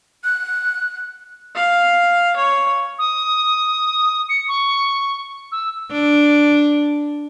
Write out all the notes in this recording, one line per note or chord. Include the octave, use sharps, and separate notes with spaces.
F#6
F5
C#5
D#6
C#7
C#6
E6
D4